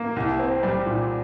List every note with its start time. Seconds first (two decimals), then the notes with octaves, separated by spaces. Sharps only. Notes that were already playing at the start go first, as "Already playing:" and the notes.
Already playing: A#3
0.16 C2
0.39 C4
0.63 G3
0.86 A#2